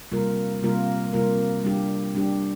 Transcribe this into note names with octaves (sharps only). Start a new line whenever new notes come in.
C3 G3 A#3 F4 A#4
C3 G3 A#3 F4 A#4
C3 G3 A#3 F4 A#4
G3 D4 G4
G3 D4 G4